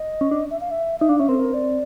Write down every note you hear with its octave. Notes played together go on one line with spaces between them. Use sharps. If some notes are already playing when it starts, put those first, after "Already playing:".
Already playing: D#5
C#4
D4
E5
F5
E5
D#4 E5
D4 F5
C#4 E5
C4 A#4
A4
A#4
D5